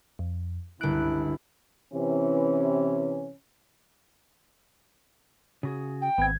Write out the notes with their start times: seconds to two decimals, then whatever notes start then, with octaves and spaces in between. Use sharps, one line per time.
0.19 F2
0.81 G1 C#2 E4 F#6 D7
1.92 C3 E3 C#4
5.63 C#3 F#4 G#4
6.02 G5
6.18 G#1 B3 C4 G#6